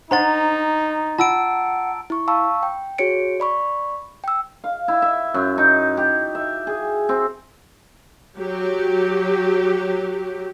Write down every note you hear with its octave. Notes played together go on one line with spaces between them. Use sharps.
D4 D#4 C5 F#5 A#5 C6 A6
F4 F#5 A5 E6 D7
E4 C#6
F5 A5 B5 C#6 E6
G5
F#4 G#4 C#5 C#7 D7
D5 B5 C#6
G5 E6
F5
E4
E5
F#2
D#4
G4
E5
G#4
C4
F#3 G4